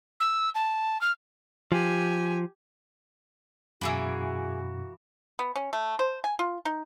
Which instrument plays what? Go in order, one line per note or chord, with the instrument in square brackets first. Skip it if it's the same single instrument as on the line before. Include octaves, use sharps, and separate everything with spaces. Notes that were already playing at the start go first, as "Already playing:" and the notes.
[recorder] E6
A5
F6
[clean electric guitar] F3 [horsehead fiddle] G4 G#5
[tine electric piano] F#2 B2 [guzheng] E3 A#3 [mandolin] E4 G#4 B5 [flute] F#4
[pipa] B3
C#4
A3
C5
G#5
F4
D#4